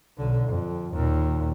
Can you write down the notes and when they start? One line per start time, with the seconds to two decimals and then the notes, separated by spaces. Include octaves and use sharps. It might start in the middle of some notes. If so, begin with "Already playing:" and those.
0.17 B1 D3
0.47 F2
0.94 D#2 A#2